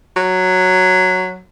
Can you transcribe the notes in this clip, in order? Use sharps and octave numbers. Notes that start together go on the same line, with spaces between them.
F#3